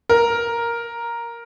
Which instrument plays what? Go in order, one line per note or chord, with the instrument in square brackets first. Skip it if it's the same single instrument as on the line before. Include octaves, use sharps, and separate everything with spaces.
[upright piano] A#4